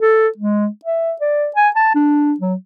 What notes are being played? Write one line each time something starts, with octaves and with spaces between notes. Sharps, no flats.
A4
G#3
E5
D5
G#5
A5
D4
F#3